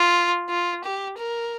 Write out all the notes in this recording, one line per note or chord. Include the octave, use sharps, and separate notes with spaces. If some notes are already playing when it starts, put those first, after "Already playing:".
Already playing: F4
F4
G4
A#4